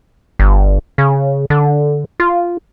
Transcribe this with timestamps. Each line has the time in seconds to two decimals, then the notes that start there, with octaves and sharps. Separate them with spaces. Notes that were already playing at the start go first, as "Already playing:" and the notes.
0.39 G1
0.98 C#3
1.50 D3
2.20 F4